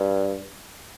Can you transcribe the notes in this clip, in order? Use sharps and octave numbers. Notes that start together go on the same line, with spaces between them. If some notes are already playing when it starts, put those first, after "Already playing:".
Already playing: G2